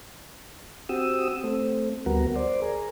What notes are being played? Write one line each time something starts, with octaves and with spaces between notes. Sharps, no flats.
C4 F#4 G4 D#6 E6
A3 C4
D2 G3 B3 F#4 A#4
C5 D5
G#4 A#4